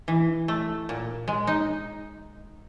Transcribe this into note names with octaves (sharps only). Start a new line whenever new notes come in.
E3
A3
A#2
G#3
D#4